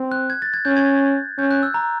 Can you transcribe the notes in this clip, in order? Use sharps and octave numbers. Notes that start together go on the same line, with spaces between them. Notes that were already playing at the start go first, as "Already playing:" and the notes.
Already playing: C4
F#6
G#6
A6
G#6
C#4 G6
G#6
C#4 G6
F#6
E6
A#5